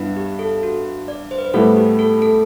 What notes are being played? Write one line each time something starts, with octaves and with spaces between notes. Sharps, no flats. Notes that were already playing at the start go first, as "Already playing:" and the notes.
Already playing: G2 B3 E4
G4
A4
F#4
D5
C5
B4
C5
A2 G3 B3 E4 A4
G4
A4
A4